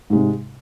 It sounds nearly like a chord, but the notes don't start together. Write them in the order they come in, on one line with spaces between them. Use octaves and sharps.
G#2 G#3 C3